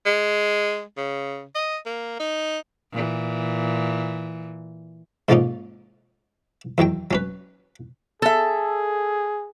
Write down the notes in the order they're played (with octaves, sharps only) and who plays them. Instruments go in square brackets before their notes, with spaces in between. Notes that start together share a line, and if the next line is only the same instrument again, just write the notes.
[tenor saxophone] G#3
C#3
D#5
A#3
D#4
[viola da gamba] A#2 E3
[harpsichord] G#2 D3 F3 A#3 C#4 D#4
E2 D#3 F#3 G5
F#3 C#4 B4
[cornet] G#4 [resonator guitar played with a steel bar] A4 E5